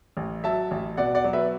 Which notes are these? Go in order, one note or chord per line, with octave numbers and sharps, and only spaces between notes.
A1
F#3 E5 A5
A1
B2 D5 F#5
D5 F#5
F#3
B4 E5